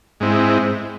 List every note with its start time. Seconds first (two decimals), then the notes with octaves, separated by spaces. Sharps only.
0.20 G#2 G#3 C4 E4